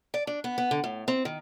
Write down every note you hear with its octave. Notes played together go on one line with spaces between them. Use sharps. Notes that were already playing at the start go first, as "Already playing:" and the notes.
D5
D4
B3
B3
D3
A2
C4
D#3